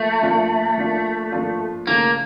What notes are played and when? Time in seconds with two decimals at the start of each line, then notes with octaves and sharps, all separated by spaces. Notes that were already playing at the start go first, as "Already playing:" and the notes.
Already playing: F3 A3 A#3 F4
0.23 F3 A#3 D4 F4
0.77 F3 A#3 D4 F4
1.32 F3 A#3 D4 F4
1.87 C#3 E3 A3 A#3